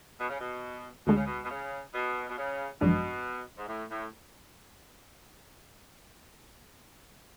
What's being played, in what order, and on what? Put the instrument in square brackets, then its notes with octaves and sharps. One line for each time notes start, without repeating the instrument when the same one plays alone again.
[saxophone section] B2
C#3
B2
[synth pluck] D2 D3 G#3 [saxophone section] B2
[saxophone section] C#3
B2
B2
C#3
B2
B2
C#3
[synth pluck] G#1 F#2 F3 G#3 D4 [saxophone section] B2
[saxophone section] G#2
A2
A2